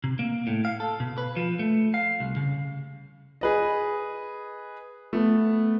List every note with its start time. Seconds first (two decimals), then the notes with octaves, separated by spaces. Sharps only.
0.04 C3
0.19 A#3
0.47 A2
0.65 F5
0.80 A4
1.00 B2
1.18 B4
1.36 F3
1.59 A3
1.94 F5
2.20 C2
2.36 C#3
3.41 G#4 B4 D#5
5.13 A3 B3